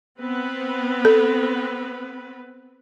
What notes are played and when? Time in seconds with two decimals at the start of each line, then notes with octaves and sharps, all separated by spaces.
0.21 B3 C4 B4
1.05 A4